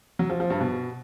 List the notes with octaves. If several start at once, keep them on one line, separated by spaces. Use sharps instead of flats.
F#3
F3
F3
G2
B2